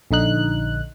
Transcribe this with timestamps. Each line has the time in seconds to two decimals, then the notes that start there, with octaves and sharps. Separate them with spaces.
0.11 A#1 D3 D#4 F#6